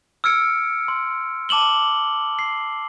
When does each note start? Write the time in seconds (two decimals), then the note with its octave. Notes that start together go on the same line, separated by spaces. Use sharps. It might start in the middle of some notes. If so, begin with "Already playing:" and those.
0.24 E6 F6 G#6 C#7 D7
0.88 C6
1.49 A5 D6 E7 F#7 G7
2.39 C7